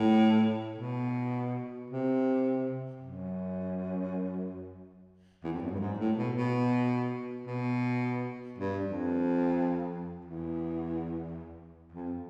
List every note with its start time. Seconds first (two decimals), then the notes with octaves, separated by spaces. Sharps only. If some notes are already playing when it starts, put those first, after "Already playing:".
Already playing: A2
0.79 B2
1.91 C3
3.01 F#2
5.44 E2
5.53 F2
5.62 F#2
5.71 G2
5.79 G#2
5.99 A2
6.17 B2
6.36 B2
7.47 B2
8.58 G2
8.86 F2
10.25 E2
11.92 F2